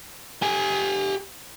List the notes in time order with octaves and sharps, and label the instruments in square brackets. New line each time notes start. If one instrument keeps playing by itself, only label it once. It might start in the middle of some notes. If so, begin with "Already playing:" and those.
[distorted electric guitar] G4 G#5